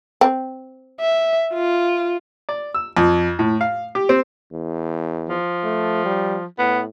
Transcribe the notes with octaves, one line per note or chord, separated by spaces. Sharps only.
C4
E5
F4
D5
E6
F2
A2
F5
G4
C4
E2
F3
A3
G3
A2 B3